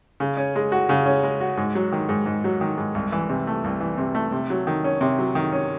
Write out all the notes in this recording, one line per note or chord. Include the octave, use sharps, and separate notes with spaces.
C#3
C#4
G#3
F#4
C#3
C#4
G#3
F#4
G#2
F#3
D#3
G#2
G#2
F#3
D#3
G#2
C2
E3
C3
A3
C2
E3
C3
A3
C3
F#3
D#3
C#4
C3
F#3
D#3
C#4